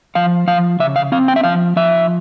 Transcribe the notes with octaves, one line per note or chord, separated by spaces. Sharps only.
F3 F5
F3 F5
C#3 E5
F5
C4 F5
G5
E5
F3 F5
F3 E5